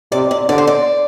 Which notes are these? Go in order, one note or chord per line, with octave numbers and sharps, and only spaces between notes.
C3 D5
D5
D3 D5
C5
D5